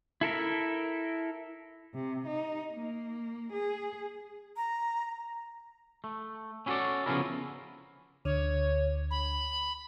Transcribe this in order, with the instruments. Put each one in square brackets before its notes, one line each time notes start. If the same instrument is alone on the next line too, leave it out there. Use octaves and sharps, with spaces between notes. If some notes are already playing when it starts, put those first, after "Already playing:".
[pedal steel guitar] E4 A4 A#4 E5
[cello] C3
D#4
A#3
G#4
[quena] A#5
[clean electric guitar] A3
C#4 E4 F#4 G#4 A4 D5
C#3 F3 B3 C#4 E4 A#4
[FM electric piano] D2 D3 [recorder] C#5
[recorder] B5